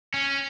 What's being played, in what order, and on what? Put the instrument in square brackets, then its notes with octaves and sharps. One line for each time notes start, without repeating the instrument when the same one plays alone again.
[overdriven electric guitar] C#4